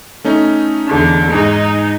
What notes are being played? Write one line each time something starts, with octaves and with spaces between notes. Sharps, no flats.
A3 C#4 D#4
E2 D3
G#2 D#4 G#4